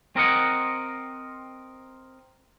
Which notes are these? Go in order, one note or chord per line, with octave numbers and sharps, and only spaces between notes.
C4 A#4 D#5 F#5